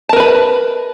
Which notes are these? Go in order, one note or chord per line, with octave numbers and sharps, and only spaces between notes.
A#4 B4 A5 B5